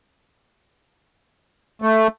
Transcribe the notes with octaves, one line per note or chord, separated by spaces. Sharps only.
A3